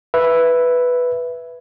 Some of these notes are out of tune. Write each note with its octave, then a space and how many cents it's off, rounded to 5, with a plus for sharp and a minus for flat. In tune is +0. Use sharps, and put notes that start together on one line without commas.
B4 +0 E5 +5